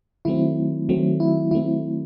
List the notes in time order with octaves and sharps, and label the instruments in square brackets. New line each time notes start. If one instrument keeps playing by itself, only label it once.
[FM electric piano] D#3 F#3 A3 C4 E4
D#3 F#3 A3 C4
E4
D#3 F#3 A3 C4 E4